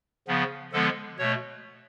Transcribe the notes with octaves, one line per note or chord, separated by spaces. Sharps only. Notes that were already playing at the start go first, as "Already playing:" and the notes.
C#3 F3 B3
D3 F3 G#3 B3 A4
B2 A3 C#5